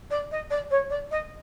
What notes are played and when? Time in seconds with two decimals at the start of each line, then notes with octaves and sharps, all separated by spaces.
0.10 D5
0.31 D#5
0.50 D5
0.70 C#5
0.90 D5
1.11 D#5